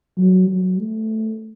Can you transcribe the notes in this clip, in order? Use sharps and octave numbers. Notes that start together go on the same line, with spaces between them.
F#3
F#3
A3